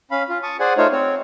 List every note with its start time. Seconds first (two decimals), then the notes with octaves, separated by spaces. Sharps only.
0.11 C#4 F5 B5
0.29 F4
0.43 A5 C#6 D#6
0.60 G#4 C5 D5 F#5 G#5
0.77 A3 D#4 F4 C5 C#5
0.92 C4 C#5